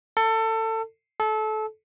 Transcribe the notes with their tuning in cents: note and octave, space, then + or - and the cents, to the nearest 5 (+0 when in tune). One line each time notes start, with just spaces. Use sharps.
A4 +25
A4 -25